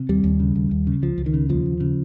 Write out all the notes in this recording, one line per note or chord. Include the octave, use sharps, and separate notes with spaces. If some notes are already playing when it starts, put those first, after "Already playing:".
Already playing: C3
D#2 G3
D#2
C#3
D#2
D#2
C#3
C#2 F3
C#2
D#3
C#3
D#2 F3
D#2
C#3